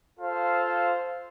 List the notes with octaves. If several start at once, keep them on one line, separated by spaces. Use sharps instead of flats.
F4 A4 C5 F5